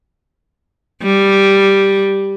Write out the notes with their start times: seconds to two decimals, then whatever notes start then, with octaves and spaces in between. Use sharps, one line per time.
1.03 G3